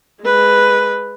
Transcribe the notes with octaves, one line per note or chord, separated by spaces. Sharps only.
G#3 B4